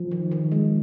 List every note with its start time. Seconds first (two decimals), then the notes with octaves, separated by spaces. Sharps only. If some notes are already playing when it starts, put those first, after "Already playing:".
Already playing: F3
0.11 D#3
0.31 D#3
0.52 G#3